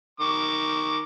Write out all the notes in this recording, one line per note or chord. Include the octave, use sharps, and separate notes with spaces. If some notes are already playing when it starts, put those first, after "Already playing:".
D#3 C#6 D6